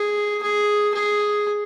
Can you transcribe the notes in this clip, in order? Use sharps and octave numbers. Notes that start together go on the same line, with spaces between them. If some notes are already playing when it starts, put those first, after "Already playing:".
Already playing: G#4
G#4
G#4